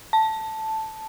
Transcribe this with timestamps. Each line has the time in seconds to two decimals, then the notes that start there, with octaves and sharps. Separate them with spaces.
0.13 A5